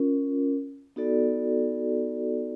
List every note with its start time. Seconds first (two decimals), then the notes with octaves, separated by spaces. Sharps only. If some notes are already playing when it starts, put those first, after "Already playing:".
Already playing: C#4 F4 A#4
0.96 B3 D#4 F#4 A4 D5